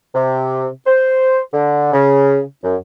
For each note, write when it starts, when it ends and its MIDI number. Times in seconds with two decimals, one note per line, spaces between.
0.15 0.67 48
0.87 1.39 72
1.54 1.92 50
1.93 2.41 49
2.64 2.76 42